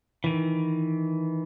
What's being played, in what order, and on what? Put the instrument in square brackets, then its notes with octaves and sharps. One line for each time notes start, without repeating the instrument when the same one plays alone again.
[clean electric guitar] D#3 E3